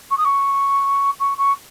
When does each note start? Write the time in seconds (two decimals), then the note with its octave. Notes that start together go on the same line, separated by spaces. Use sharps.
0.10 C#6
0.17 D#6
0.25 C#6
1.20 C#6
1.37 C#6